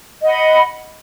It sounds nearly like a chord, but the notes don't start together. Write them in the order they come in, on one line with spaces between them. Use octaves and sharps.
D#5 F#5 B5